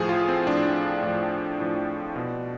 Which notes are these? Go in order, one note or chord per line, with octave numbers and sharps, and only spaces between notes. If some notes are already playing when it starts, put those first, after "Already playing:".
Already playing: A2 F3 G#4
F4
C4
A2 F3 D4
A2 F3
A2 F3
B2